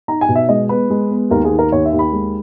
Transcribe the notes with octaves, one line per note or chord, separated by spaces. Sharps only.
D#4 A#5
G#5
B2
E5
G#3 D#5
B3 B4
G#3
B3
D#2 A#4
G#4
D#3
A#4
D#2 C#5
E5
D#2
B5
G#3